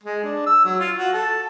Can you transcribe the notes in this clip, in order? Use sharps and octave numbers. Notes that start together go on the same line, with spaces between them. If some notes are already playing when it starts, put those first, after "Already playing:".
G#3
D4
E6
F#3
F4
F#4
A4